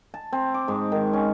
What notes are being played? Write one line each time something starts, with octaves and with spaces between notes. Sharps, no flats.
A5
C4
D6
G#2
D#3
C#4